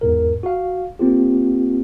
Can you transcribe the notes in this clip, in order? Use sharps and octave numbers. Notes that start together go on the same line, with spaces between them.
E2 G#2 A#4
F#4 F5
A#3 C4 F4 G4